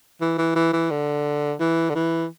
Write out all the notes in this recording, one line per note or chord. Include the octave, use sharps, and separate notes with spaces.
E3
E3
E3
E3
D3
E3
D3
E3